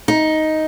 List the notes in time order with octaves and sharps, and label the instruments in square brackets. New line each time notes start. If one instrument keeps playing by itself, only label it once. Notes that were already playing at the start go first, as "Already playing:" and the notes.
[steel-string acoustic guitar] D#4